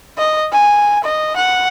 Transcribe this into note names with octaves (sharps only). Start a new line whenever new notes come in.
D#5
G#5
D#5
F#5